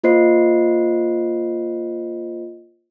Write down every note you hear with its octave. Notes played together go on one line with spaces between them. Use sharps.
A#3 F4 C5 D#5 C7